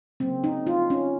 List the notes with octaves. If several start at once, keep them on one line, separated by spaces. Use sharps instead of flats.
C#3 F#3 A#3 C4
D#4
F4
C#4